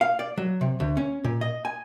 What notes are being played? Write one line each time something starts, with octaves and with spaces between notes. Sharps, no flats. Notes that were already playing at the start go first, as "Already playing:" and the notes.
F5
D5
F#3
C3
D2
C#4
A#2
D#5
G#5